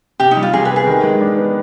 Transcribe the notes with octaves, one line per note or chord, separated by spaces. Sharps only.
C3 G4
D#4
G3
F4
C3 G#4
B3 B4
G#4
D#3
G#3
D4
B3